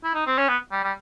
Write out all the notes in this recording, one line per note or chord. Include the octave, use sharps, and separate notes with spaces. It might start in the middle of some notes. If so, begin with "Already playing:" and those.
E4
D#4
C4
C#4
B3
G3
G3